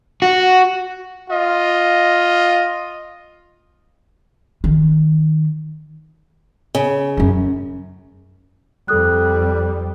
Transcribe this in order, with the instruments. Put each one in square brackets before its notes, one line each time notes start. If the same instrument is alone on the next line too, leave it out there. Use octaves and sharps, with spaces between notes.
[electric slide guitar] F#4
[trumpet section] F4 D#5
[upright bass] D#3
[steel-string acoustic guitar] C#3
[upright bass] F#2 C#4
[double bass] F2 G3 [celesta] A4 D#6 F#6